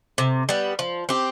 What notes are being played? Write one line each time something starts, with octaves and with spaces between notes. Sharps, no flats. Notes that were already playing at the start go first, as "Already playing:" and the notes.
C3
G3 B3
F3
C4 G4